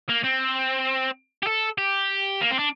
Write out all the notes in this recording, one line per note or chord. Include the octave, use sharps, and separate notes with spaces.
A#3
C4
G4
A4
G4
A#3
C4
D4